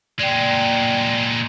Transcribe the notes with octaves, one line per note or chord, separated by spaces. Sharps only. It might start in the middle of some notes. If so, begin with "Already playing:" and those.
A#2 G#3 D5 G5